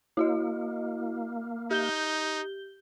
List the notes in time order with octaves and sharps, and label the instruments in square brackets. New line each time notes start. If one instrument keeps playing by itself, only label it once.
[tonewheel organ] A#3 [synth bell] E4 F#4 D#5
[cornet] D#4 [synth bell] G4 G6 G7